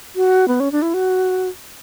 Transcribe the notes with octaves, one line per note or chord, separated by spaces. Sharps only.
F#4
B3
C#4
D4
E4
F#4